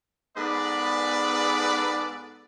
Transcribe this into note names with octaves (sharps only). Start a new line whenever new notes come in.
G#2 B3 G#4 A4 B4 D5